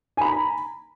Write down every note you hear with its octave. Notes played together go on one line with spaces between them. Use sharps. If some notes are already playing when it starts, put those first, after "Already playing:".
G#5 A#5 B5